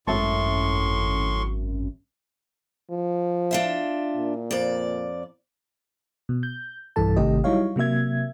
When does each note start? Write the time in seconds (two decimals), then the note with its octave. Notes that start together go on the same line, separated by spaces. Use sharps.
0.07 G#1 F#2 A2 E5 A5 C6 C#6
2.91 F3
3.51 D4 F4 E5
4.16 A#2
4.51 F2 D5
6.29 B2
6.43 G6
6.96 B1 G2 E3 A4 A5
7.16 G#1 C3 D#3 A3 G4 D#5
7.44 F#3 G3 D#4 E4 C#5 F5
7.76 C3 F#3 A#3 E5 G#6